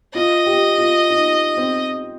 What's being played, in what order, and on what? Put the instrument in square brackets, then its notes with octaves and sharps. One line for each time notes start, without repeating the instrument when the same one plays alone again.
[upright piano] F4 [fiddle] D#5
[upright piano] G4
F4
D#4
C4